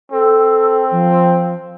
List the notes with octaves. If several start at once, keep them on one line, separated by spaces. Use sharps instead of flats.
C4 A4
F3